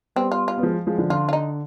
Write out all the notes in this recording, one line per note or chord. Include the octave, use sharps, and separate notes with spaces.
G3 B3 C4
F4
F4
B3
F3 G#3
F3 G#3
D3 F3
D3 F4
F4
D#4